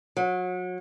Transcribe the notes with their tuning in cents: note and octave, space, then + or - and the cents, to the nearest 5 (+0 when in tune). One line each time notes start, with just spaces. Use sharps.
F#3 -30